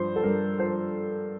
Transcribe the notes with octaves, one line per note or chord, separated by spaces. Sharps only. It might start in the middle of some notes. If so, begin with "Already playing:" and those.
Already playing: G2 F3 C5
A4
G2 A#4
F3 C5